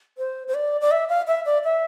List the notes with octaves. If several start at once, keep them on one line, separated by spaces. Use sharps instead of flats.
C5
C5
D5
D5
E5
F5
E5
D5
E5